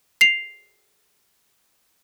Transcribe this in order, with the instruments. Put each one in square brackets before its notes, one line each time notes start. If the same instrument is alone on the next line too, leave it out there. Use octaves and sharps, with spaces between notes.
[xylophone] C7 F7